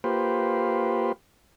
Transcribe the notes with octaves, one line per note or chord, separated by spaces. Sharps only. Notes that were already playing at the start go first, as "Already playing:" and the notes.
A#3 F4 G4 B4 C5